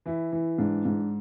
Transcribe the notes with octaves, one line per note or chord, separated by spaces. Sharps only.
E3 E4
E3
G#2 D4
G#2